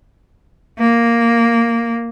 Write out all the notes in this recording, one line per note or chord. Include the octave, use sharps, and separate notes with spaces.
A#3